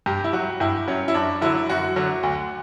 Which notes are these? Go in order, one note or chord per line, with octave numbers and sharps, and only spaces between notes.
G2 G4
E4
F#3 F#4
G2 E4
F#3 C#4
E4
F#2 D4
D3 F#3 E4
F#2 F#4
D3 F#3
D2